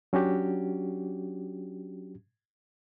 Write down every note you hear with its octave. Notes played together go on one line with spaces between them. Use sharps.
F#3 C#4 D4 F#4 G4